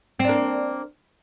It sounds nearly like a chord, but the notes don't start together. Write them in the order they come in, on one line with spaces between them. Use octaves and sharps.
C4 D4 A#3